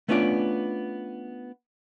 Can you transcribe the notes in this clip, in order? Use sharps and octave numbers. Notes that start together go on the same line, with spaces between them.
A3 B3 C#4 D4 F4 D5